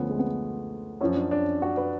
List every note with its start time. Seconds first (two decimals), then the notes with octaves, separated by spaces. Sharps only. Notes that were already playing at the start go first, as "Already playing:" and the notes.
Already playing: D2 D3 F3 B3 C#4
0.10 G#3
0.19 B3
1.01 F#2 F3 C#4
1.16 D4
1.31 D4
1.62 F#4
1.77 B4